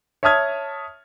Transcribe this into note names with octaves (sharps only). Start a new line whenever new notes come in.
C#5 E5 A5 D#6 F6 G#6